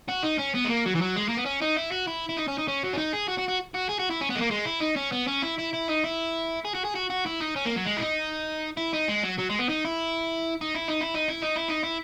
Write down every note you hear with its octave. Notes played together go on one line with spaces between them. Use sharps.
F#4
D#4
C#4
B3
G#3
A#3
F#3
E3
F#3
G#3
A#3
B3
C#4
D#4
E4
F#4
E4
E4
D#4
C#4
D#4
C#4
F#3
C#4
D#4
G#4
F#4
F#4
F#4
F#4
G#4
F#4
E4
C#4
B3
G#3
A#3
G#3
E4
D#4
C#4
B3
C#4
E4
E4
E4
D#4
E4
G#4
F#4
G#4
F#4
F#4
E4
D#4
C#4
A#3
F#3
G#3
E4
D#4
E4
D#4
G#3
F#3
F#3
G#3
B3
D#4
E4
D#4
E4
D#4
E4
D#4
E4
D#4
E4
D#4
E4